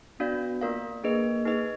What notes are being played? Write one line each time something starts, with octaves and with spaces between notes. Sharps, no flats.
B3 D4 F#4 D5 F5
A#3 F4 A#4 D5 F5
A#3 D4 G#4 B4 D#5
D#4 G#4 B4 D#5